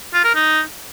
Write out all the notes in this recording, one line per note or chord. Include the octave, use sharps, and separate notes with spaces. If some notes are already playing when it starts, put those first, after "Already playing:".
F4
A#4
D#4